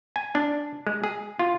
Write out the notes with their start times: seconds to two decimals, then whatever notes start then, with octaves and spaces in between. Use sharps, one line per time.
0.16 G#5
0.35 D4
0.87 G#3
1.04 G#4
1.39 F4